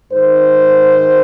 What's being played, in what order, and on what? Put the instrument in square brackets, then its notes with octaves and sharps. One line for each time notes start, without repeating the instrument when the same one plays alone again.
[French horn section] G#2 D#3 C5